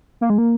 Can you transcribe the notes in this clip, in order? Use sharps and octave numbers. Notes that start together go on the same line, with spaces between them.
A#3
G#3
A#3